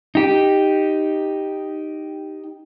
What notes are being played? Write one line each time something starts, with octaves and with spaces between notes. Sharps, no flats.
D#4 G4